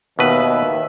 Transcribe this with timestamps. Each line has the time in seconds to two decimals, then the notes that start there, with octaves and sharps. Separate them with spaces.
0.19 D#2 B2 B3 B4 E5